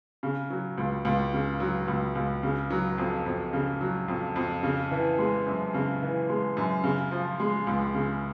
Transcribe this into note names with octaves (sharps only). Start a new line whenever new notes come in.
C#3
F#3
C#2
C#2
C#3
F#3
C#2
C#2
C#3
F#3
F2
F2
C#3
F#3
F2
F2
C#3
E3
G#3
F#2
C#3
E3
G#3
F#2
C#3
F3
G#3
C#2
C#3